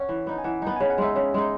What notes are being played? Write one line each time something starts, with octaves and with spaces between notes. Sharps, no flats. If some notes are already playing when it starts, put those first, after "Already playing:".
Already playing: C#4 F#5
E3
B3 D#4
G#5
E3 F#5
B3 D#4
C#3 G#5
F#5
G#3 D#4 E5
C#3 D#5
G#3 D#4